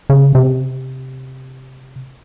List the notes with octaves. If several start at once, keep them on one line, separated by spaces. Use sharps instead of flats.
C#3
C3